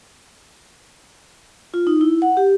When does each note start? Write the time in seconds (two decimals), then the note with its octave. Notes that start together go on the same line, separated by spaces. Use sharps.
1.74 F4
1.87 D#4
2.01 E4
2.22 F#5
2.37 G4